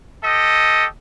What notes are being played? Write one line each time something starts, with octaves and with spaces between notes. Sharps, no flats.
G4 A4 D#5